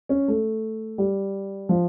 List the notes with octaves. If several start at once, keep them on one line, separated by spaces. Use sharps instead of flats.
C#4
A3
G3
F3